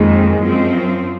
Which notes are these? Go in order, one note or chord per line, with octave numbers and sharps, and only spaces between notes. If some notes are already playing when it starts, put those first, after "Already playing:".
Already playing: F2 D#3 G#3 A#3
F#2 F3 C4